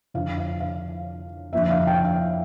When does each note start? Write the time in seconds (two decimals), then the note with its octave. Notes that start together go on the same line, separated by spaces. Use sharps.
0.14 F2 D3 F3 F5
0.38 F5
0.60 F5
1.53 F2 D3 F3 A#3 E5
1.63 E5
1.70 F5
1.87 G5
2.05 F5